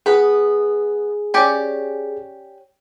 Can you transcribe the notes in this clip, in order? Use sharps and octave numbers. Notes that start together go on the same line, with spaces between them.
B3 G#4 B4
C#4 G4 D5